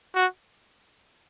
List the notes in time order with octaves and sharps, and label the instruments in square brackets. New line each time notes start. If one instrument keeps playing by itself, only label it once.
[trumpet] F#4